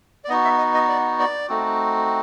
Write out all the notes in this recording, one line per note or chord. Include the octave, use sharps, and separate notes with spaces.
D5
B3 D#4 F#4 D#5
E5
D#5
D#5
D5
D5
A3 C4 D#4 F#4